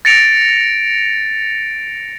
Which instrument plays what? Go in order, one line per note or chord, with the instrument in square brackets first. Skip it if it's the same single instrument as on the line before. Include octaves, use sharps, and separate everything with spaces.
[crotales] A6 A#6 C#7 D7 F7